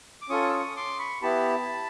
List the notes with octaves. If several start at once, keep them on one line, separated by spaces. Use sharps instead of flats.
D6
C#4 F4 A4 C#6 D#6
E6
C#6 D#6
C6 D6
B5 C#6
B3 E4 G4 A5 B5